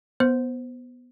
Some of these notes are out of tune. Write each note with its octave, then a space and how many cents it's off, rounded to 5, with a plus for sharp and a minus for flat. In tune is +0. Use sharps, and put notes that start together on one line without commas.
B3 +0 C5 +0